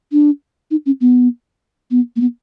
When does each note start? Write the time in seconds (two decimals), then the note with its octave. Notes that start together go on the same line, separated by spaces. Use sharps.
0.12 D4
0.71 D#4
0.86 C#4
1.01 B3
1.91 B3
2.16 A#3
2.21 B3